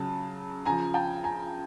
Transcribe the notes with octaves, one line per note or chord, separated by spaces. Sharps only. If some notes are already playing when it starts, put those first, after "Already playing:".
Already playing: C#3 F#3 A5
C#3 F3 G#5 A#5
G5 A5
G#5 A#5